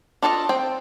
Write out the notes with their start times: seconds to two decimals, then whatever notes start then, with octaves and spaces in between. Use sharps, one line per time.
0.22 D4 F4 A4 C5 D#5
0.49 C4 G5